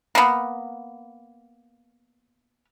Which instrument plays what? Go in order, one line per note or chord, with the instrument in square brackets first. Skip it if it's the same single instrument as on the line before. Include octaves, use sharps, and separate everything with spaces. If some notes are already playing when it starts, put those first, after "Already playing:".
[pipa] A#3 B3